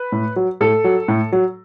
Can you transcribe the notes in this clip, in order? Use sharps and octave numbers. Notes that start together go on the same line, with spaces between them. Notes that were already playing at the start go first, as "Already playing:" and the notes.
Already playing: B4
A2
F#3
A2 A4
F#3
A2
F#3